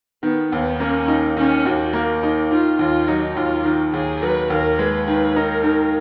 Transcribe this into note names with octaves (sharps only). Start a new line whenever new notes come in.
D#3 B3
D#2 B3
A#3 C#4
D#4
D#3 C#4
D#2 F#4
A#3
D#4
D#3 F4
D#2 F4
F#3 D#4
D#2 F4
D#3
D#2 G#4
F#3 B4
D#2 A#4
G#3 B4
D#3 B4
D#4 A#4
D#3